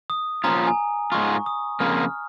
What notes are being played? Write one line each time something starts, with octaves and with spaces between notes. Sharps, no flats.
D#6
A#2 F3 C#4 F4 A#5
G#5
G#2 G#3 F4 C#6
D#6
F2 C#3 A#3 F4 F6